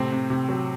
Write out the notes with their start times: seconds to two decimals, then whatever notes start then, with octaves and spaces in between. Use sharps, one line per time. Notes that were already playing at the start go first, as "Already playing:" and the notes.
Already playing: A2 C3 C4
0.12 C3
0.30 C3
0.49 F#3